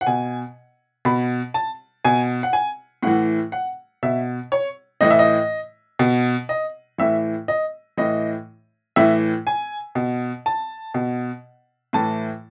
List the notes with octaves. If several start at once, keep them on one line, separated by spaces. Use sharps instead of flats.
F#5
B2 G#5
B2 B5
A5
B2 G#5
F#5
G#5
A2 E3 F#5
F#5
B2 E5
C#5
A2 E3 D#5
E5
D#5
B2
D#5
A2 E3 E5
D#5
A2 E3 D#5
A2 E3 E5
G#5
B2
A5
B2
A2 E3 A5